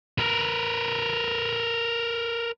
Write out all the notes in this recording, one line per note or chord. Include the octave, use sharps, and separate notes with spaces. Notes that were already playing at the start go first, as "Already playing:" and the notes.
A#4 B4